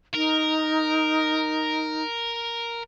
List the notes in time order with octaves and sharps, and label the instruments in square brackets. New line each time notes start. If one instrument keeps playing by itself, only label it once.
[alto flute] D#4 [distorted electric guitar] A#4